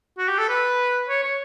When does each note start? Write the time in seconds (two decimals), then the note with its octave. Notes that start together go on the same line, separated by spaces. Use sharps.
0.18 F#4
0.28 G4
0.38 A4
0.49 B4
1.09 C#5
1.23 C#5